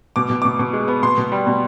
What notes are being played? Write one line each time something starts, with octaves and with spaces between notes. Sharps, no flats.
B2 D6
B2
B2 D6
B2
G#3
B3
B2 C6
B2
G3
B2